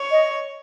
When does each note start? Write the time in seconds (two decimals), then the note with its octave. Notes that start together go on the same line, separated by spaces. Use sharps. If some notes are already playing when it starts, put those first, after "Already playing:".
Already playing: C#5
0.11 D#5